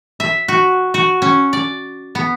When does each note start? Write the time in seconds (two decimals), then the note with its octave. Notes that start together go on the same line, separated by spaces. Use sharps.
0.20 E5
0.48 F#4
0.94 F#4
1.22 C#4
1.53 D5
2.15 B3